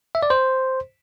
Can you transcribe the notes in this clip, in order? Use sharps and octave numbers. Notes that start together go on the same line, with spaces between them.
E5
D5
C5